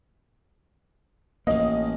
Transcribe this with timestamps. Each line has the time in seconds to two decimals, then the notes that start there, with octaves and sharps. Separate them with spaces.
1.47 A1 A#3 D#5